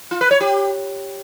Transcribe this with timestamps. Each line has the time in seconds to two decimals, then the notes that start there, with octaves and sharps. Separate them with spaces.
0.11 F4
0.21 B4
0.31 C#5
0.41 G4